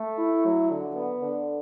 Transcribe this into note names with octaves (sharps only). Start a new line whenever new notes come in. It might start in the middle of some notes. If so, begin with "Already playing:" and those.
Already playing: A3
E4
F#3
D3
B3
D3